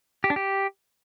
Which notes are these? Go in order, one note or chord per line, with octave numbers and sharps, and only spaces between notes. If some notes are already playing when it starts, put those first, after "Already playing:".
G4
D4
G4